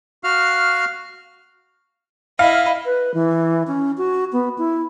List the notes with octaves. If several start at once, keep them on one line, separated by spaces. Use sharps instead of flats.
F#4 F5 F6
E4 D#5 F5
B4
E3
C#4
F#4
B3
E4